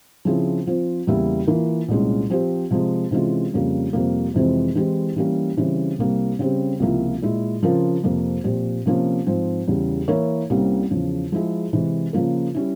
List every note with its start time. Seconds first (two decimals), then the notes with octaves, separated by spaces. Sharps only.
0.25 C#3 F3 C4 E4 G#4
0.66 F3 C4 F4 C5
1.07 E2 C#3 G3 A#3 E4
1.47 E3 A#3 F4 A#4
1.88 C2 A#2 G#3 C#4
2.30 F3 C4 G4 C5
2.71 C3 F3 G#3
3.11 C3 E3 G#3 C#4 F4
3.53 F2 C#3 G3 A#3
3.93 F2 C3 G3 A#3
4.34 F2 C3 E3 G#3 C4
4.75 E3 G#3 C4 E4 G4
5.16 E3 G3 A#3 C#4
5.57 C#3 E3 G3 C4
5.98 C2 C3 G3 A#3
6.39 C#3 G3 C4 G4
6.80 C#2 C3 F3 A#3 E4
7.22 A#2 G#3 E4
7.62 C#3 F3 C4 F4 A#4
8.03 F2 C3 F3 A#3
8.44 A#2 F3 C4 G4
8.86 C3 F3 A#3 C#4
9.26 G#2 F3 C4
9.67 E2 C#3 G3
10.08 E3 A#3 E4 A#4 C#5
10.50 C2 C3 G3 A#3 C#4
10.91 E2 C#3 F3
11.32 F3 G#3 E4 G#4
11.73 C3 E3 G#3
12.13 C#3 F3 A#3 F4 A#4
12.55 G3 C#4 E4